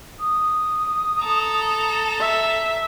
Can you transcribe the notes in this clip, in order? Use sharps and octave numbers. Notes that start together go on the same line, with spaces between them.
D#6
A4 A#5
E5